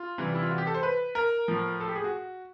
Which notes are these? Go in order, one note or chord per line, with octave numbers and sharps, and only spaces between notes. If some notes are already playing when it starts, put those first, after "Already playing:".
Already playing: F4
C3 E3 G3
E4
F4
F#4
G4
A4
C5
B4
A#4
A2 F3
A4
G4
G#4
F#4